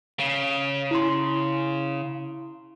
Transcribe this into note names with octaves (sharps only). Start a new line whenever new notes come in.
C#3
E4 C6